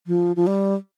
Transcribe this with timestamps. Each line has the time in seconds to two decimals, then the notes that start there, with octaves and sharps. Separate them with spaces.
0.07 F3
0.36 F3
0.47 G3